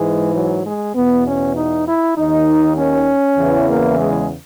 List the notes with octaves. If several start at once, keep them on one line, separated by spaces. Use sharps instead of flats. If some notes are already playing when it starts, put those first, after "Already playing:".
Already playing: G#2 E3 G#3
F#3
G#3
E2 B2 B3
C#4
D#4
E4
D#2 D#3 D#4
C#4
E2 C#3 E3
A#3
G#3